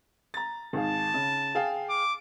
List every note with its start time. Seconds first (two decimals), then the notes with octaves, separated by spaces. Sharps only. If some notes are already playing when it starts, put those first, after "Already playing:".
0.34 A#5 A6
0.73 G#1 G#4 F5 A5
1.14 C#3
1.55 G#4 F5 G5
1.89 D6